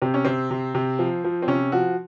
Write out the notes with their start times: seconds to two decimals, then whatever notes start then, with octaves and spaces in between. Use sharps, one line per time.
0.02 C3 C4
0.14 C#4
0.25 C3 C4
0.51 C3
0.75 C3
0.99 F3
1.24 F3
1.42 C4
1.48 C3 C#4
1.72 F3 F#4